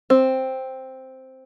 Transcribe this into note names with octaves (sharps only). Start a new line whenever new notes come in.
C4